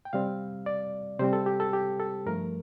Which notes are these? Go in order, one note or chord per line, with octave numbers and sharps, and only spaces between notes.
G5
C3 G3 C4 F5
D5
C3 G3 C4 C5
A4
G4
A4
G4
A4
G2 F3 A3 A#4